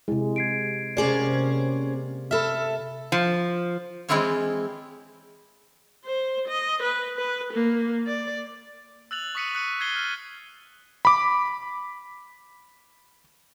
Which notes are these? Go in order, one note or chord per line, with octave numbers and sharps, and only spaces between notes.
C3 G#3 E4 G#4
G#6 C7 D7
C3 A#3 C#4 G#4 C5 D5
A4 E5 B5 E6 F6
F3
E3 G#3 C4 E4 F4 C#5
C5
D#5
B4
B4
A#3
D5
E6 F#6 A6 F7 F#7
C#6 D#6 B6 C#7 D#7
D#6 F#6 C#7 D#7
F#6 G#6 A6 C7 D#7 G7
F6 D#7
B5 D6